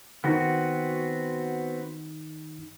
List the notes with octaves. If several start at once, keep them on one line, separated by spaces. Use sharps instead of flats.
D#3 B3 C4 D#4 F#4